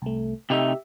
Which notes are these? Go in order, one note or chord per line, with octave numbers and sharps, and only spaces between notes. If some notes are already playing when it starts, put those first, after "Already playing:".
C2 A3
C3 A3 D#4 G4 E5